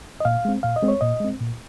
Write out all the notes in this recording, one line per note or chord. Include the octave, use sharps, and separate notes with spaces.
D#5
A#2 F5
G#3 C4
A#2 F5
D#5
G#3 C4
C#5
A#2 D#5
G#3 C4
A#2